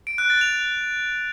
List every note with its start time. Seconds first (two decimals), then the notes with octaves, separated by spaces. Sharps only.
0.07 D7
0.18 F#6
0.30 A6
0.41 F7
0.53 F#6